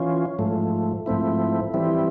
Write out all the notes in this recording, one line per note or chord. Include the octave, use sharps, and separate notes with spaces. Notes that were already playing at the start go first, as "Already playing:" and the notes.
Already playing: E3 C#4 F4
G#2 F3 A3
G#2 F3 A3 C4 E4
E3 G3 C4 E4